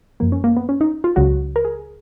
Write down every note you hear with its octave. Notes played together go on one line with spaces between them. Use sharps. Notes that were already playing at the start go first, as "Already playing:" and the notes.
F#2 F3 A#3
C#4
A#3
B3
C#4
D#4
F4
C#2 C#3 F#3 F#4
A#4
G#4